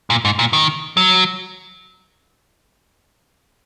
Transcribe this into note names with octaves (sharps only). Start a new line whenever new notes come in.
A#2
G#2
A#2
D#3
F#3